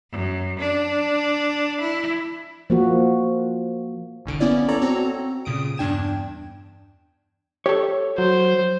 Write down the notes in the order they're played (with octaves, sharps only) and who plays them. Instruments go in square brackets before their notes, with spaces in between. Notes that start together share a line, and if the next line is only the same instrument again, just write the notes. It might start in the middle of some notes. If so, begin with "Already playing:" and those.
[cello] F#2
D4
E4
[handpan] F3 A#3 F#4
[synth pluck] G1 C2 D3 D7
A#3 B3 C#4 E4 D5
A4 C#5 D5 A#5
C4 F#4 A4 A#5
A#2 C#3 D#6 D7
E2 G2 D4 G5 G#6 E7
[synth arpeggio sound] G4 A4 [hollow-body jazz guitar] C#5
[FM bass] F#3 [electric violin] C5